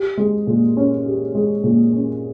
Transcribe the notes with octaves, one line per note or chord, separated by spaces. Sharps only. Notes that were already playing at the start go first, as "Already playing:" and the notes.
Already playing: G4
G#3
A#2
C#4
G4
G#3
A#2
C#4